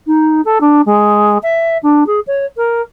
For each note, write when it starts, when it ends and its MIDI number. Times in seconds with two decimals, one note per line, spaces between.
0.07 0.41 63
0.45 0.58 69
0.60 0.81 62
0.86 1.38 56
1.43 1.77 76
1.83 2.04 62
2.06 2.20 68
2.27 2.46 73
2.57 2.81 70